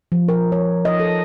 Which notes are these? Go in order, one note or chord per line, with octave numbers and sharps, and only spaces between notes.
F3
A#4
C#5
D#5
A4